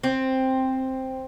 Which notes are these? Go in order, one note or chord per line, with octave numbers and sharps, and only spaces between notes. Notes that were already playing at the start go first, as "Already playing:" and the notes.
C4